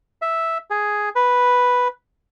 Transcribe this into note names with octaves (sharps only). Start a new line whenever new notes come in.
E5
G#4
B4